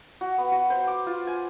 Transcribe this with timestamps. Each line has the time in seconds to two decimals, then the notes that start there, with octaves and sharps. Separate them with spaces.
0.21 F#4
0.38 B3
0.52 F#4
0.70 C5
0.87 D6
1.07 F4
1.27 G#5